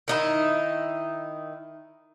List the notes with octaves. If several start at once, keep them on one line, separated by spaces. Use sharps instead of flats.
D#3 D#4 E4